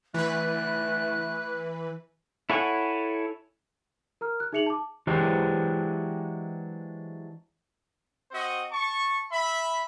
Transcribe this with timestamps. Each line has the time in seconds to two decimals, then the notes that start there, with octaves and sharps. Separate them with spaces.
0.14 E3 A3 B4 F#6
2.50 E4 A4 C#5 F#5 G#5
4.21 A#4 A#5 F6
4.40 F#6
4.52 D#4 G#4 E5 C#7 F7 F#7
4.66 A5 D6
5.07 E3 F#3 G#3 D4 G4 C5
8.31 C4 F#4 C5 D#5
8.70 A5 C#6
9.30 E5 B5